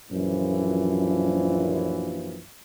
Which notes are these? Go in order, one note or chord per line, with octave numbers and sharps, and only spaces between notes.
A#1 F#2 E3 F3